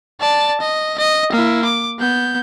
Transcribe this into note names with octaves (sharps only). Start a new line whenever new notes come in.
D5 A5
D#5
D#5
A#3 E4
D6
B3 G6